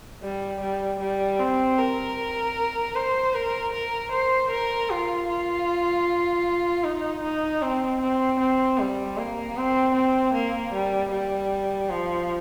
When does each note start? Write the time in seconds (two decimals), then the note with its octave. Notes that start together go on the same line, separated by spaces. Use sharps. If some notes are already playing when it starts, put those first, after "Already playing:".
0.22 G3
0.61 G3
1.00 G3
1.39 C4
1.78 A#4
2.95 C5
3.34 A#4
3.73 A#4
4.12 C5
4.50 A#4
4.89 F4
5.28 F4
6.83 D#4
7.23 D#4
7.62 C4
8.01 C4
8.40 C4
8.79 G3
9.17 A#3
9.56 C4
9.95 C4
10.34 A#3
10.73 G3
11.11 G3
11.90 F3